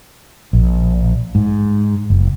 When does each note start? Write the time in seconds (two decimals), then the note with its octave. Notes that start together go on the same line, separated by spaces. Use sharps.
0.53 A#1
1.35 G#2
2.10 F#1